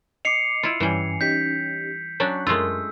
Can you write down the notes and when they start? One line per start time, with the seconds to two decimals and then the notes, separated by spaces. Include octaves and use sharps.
0.25 D#5 D6 C7 C#7 F7
0.63 E4 F4
0.80 G2 E3 G3 C#4 G#5
1.21 C#4 D#4 G4 G6 B6
2.20 F#3 C#4 D4 F#6
2.47 F#2 G#3 A3 F4 A#4 E6